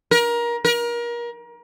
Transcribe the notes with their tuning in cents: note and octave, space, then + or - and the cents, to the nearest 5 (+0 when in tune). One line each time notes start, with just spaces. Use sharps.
A#4 +25
A#4 +30